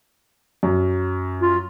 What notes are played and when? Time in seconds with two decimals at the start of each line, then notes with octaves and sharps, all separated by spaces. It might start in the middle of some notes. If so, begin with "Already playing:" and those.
0.63 F#2
1.42 F4